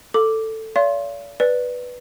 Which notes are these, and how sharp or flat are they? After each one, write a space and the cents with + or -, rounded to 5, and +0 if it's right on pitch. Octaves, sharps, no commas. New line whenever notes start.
A4 +10 D6 +0
D5 -45 F5 -40 C6 +20
B4 +0 D5 +10